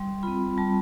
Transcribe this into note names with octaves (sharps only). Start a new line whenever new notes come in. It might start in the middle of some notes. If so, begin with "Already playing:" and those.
Already playing: G3 C6
C4 F4 B5
G3 A5